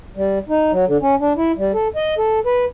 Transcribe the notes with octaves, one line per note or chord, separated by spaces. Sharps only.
G3
D#4
F#3
D3
C#4
D4
E4
G3
A4
D#5
A4
B4